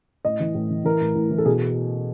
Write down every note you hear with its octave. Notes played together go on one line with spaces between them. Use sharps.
A2 D#5
E3
A2
E3
E3 A#4
A2
A2
E3
A4
B2 G#4